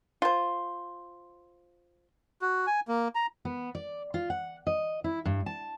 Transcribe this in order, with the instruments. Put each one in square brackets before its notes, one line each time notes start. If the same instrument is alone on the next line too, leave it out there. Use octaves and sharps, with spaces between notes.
[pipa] F4 C5
[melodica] F#4
G#5
A#3
A#5
[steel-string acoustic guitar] B3
D5
F4
F#5
D#5
E4
G2
A5